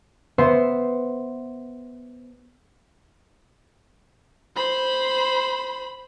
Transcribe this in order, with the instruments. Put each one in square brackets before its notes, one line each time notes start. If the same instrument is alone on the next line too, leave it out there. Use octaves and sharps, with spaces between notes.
[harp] B3 C5 E5 C6
[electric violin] C5 B5